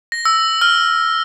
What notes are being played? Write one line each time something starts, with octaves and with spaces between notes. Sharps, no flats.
A#6
E6
F6